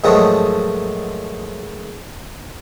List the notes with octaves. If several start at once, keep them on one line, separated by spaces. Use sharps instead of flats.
G#2 D#3 F3 F#3 A3 D#4